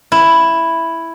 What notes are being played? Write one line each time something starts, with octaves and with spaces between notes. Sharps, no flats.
E4